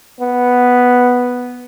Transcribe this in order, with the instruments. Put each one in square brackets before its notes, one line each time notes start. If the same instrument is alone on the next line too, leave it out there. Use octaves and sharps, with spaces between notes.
[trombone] B3